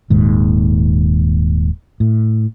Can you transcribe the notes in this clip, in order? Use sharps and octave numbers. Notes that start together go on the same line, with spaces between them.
D#1 D#2 G#2
A2